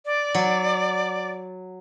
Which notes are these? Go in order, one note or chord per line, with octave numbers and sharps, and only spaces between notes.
D5
F#3